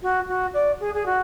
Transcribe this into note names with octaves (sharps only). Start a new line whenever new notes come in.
F#4
F#4
D5
G#4
G#4
F#4